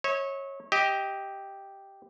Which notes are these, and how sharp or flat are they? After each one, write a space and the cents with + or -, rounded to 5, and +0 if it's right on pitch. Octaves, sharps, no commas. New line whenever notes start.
C#5 -20 E5 -45
G4 +0 D#5 +25